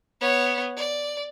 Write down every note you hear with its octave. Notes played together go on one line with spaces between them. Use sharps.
B3 C#5
D5